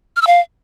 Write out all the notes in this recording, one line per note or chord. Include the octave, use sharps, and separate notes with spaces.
F6
E6
F5